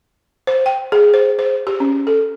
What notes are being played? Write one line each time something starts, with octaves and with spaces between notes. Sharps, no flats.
C5
G5
G#4
C5
C5
G4
C#4
A4